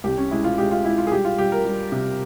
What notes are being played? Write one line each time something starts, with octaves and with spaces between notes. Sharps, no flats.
C2 G4
C#4
G#3 E4
F4
G#3 G4
F4
G#3 E4
F4
G#4
G3 G4
F4
G3 G4
A#4
G3
C3